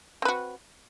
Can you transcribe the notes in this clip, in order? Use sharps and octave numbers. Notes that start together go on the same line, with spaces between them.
C4 F#4 B4